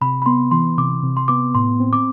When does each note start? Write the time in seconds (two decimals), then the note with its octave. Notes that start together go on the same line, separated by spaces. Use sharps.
0.01 C3 B5
0.22 B5
0.26 B3 C6
0.51 E3 C6
0.77 C3 D6
1.02 C3
1.17 C6
1.28 B3 D6
1.54 A2 C6
1.80 C4
1.93 D6